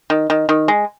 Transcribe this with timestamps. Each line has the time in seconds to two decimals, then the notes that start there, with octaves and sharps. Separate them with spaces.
0.10 D#3
0.30 D#3
0.49 D#3
0.68 G#3